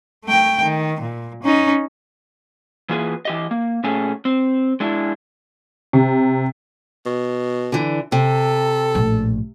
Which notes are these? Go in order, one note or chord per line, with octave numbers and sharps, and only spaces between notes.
A3 G5
D#3
A#2
C#4 D#4
E3 A#3 F4 G#4 B4
E3 G4 D#5
A#3
A#2 A3 C#4 G#4 A4
C4
G#3 D4 E4
C3
B2
D3 E3
C3 A4
A#1 A2